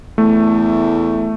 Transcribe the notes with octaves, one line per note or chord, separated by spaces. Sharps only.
E2 A3